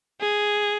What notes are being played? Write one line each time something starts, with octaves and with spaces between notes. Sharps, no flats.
G#4